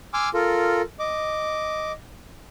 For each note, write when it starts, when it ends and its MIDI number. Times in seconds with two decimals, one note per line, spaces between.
0.14 0.29 80
0.14 0.29 84
0.14 0.29 86
0.14 0.29 88
0.14 0.29 89
0.34 0.82 65
0.34 0.82 69
0.34 0.82 70
1.00 1.92 75
1.00 1.92 86